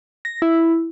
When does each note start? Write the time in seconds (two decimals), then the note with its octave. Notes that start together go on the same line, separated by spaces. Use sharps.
0.25 A#6
0.42 E4